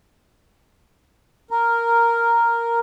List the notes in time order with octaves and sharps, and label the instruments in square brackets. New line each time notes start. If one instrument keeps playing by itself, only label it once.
[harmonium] A#4